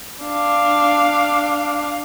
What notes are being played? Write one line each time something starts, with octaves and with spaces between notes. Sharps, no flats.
D4 F5